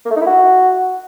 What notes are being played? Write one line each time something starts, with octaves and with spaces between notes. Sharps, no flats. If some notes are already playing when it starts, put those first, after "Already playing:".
A#3
A3
D#4
E4
F#4